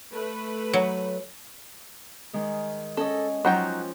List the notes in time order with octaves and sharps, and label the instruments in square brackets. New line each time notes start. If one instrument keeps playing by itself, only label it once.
[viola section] A3 B4
[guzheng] F#3
[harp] D#3 G#3
[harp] C#4 D#5 [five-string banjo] A4
[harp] F3 C#4 F4 [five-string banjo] F#3 D#4 G5